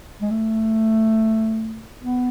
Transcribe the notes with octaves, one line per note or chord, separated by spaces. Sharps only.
G#3
A3
B3